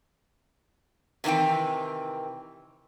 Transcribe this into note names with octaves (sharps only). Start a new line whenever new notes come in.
C3 D#3 E3 C4 G5